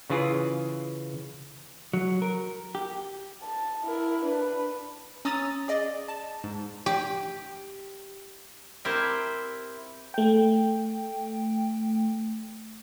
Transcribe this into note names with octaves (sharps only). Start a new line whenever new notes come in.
C#3 E3 F4 G#4
F#3
A#4
G4
A5
E4 A#4
D4 B4
C#4 A#5 D#6 E6 A6
G#4 D5 D#5
A5
G#2
G4
C4 E4 G4 A#4 C5 E5
A3 G5